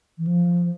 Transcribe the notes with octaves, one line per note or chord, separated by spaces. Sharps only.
E3
F3